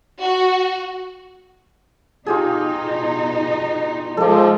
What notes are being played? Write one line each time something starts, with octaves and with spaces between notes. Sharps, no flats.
F#4
B2 D#4 F4 G4 G#4
F3 G#3 A4 D5